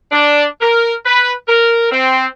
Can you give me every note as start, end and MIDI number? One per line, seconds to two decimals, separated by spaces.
0.12 0.44 62
0.61 0.93 70
1.06 1.32 71
1.48 1.91 70
1.91 2.26 60